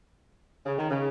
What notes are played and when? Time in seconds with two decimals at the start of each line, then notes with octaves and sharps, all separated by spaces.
0.66 C#3
0.79 D#3
0.90 C#3